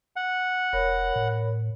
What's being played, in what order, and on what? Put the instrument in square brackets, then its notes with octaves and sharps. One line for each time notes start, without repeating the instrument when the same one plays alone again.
[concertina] F#5
[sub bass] F1 [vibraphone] A#4 C#5 B5
[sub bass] A2